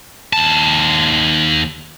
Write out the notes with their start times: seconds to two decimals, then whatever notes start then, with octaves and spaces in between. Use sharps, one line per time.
0.33 D#2 A5